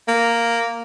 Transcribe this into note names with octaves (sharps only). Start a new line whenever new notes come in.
A#3